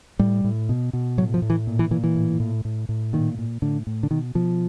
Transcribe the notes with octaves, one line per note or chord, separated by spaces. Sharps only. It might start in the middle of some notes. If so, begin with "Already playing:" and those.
A2 G3
A2
B2
B2
A2 F#3
F3
A2
E3
A#2
E3
A#2 E3
E3
A2
A2
A2
A2
A#2 D#3
A#2
A2 D3
A2
D3
B2 D#3
B2 F3